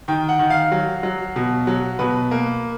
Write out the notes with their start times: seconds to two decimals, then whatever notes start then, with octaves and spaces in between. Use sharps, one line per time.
0.08 D#3 G5
0.29 F#5
0.39 D#3
0.50 F5
0.72 F#3
1.03 F#3
1.36 B2
1.67 F#3
1.99 B2 B4
2.31 A#3